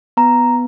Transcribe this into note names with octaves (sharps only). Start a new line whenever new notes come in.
B3 A#5